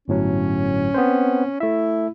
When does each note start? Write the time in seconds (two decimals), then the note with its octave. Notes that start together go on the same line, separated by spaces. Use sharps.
0.08 G1 A2 F#3 C#4
0.94 B3 C4 C5
1.60 A3 E4 E5